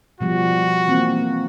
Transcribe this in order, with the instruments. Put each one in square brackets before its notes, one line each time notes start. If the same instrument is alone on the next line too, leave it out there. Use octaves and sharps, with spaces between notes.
[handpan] B2 F3 G3 [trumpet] F#4
[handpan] E3 A#3 C4